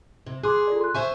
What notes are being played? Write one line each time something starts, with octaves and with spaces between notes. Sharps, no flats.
C3
G#4 C6 D6 F#6
F4 A4 D5
C6 F#6
C5 E5 G#5 C#6